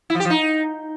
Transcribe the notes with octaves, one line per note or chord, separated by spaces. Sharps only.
E4
F3
G4
F3
D#4